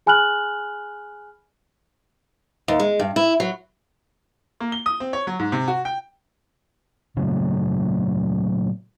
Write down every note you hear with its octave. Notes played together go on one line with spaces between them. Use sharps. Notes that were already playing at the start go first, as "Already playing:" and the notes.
G#4 G#5 B5 F6 F#6 F#7
D#2
G#3
G2
E4
F#3
A#3
G7
D#6
C4
C#5
F#3
G#2
C3
F#4
G5
A#2 C#3 F#3 A3